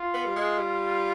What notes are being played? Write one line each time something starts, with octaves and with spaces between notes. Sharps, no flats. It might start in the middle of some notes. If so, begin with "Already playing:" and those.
Already playing: F4
B3
G3
G#3
G3